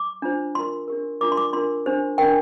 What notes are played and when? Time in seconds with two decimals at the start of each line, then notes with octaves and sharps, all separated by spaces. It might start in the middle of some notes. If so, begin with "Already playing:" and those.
Already playing: D6
0.22 D4 F4 C5
0.55 F4 A#4 C6
0.88 D4 G4 A#4
1.21 D4 F4 A#4 D6
1.32 C6
1.37 D6
1.53 D4 F4 A#4 C6
1.86 D4 G4 C5
2.18 D4 A#4 G5